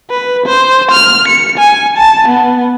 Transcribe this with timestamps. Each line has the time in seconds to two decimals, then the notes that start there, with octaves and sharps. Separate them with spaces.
0.10 B4
0.46 C5
0.92 F6
1.28 C#7
1.58 G#5
1.97 A5
2.28 B3